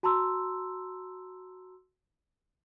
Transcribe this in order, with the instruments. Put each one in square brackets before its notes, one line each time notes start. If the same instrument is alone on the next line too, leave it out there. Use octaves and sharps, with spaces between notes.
[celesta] F#4 A5 A#5 C6 E6